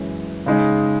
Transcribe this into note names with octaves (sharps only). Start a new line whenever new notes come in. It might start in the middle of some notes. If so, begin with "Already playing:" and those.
Already playing: F#2 E3 G#3 C#4
C#3 G#3 D#4